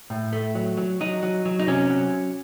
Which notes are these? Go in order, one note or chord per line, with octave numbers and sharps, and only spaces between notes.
A2
A3
F#3
F#3
F#3 D#4
F#3
F#3
D#4
C3 C#4
F#3